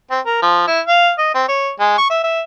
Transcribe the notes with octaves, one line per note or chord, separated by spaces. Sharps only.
C4
A#4
F3
E4
F5
D#5
C4
C#5
G#3
C#6
E5
E5